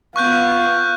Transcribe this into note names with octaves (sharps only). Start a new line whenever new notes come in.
B3 F4 F5 C#6 F#6 G6